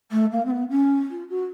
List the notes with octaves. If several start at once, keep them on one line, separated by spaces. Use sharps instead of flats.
A3
A#3
C4
B3
C#4
F4
F#4